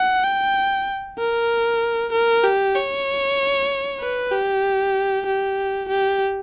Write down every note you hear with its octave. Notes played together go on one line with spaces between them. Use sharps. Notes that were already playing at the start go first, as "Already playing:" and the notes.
Already playing: F#5
G5
A#4
A#4
G4
C#5
B4
G4
G4
G4